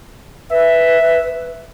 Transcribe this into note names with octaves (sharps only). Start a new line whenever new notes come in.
B4 E5